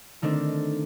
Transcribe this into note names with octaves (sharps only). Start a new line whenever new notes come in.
D3 D#3 A3 C4 D4